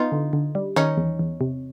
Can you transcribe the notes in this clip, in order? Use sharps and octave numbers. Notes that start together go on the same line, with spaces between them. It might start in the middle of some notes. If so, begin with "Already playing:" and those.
Already playing: B3 D#4 F4
D3
D3
G3
D#3 C#4 D#4
E2
E2
C3